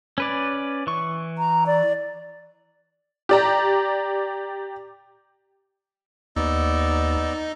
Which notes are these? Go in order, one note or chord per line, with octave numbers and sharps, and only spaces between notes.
C#4 B4 D5
E3 C#6
A#5
D5
G4 D5 A#5
D#2 B3 D#4 D5 E6